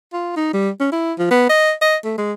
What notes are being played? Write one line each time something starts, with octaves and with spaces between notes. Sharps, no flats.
F4
D#4
G3
C#4
E4
F3
B3
D#5
D#5
A3
G#3